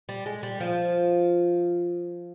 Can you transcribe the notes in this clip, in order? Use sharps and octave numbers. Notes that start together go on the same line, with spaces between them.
G3
G#3
G3
F3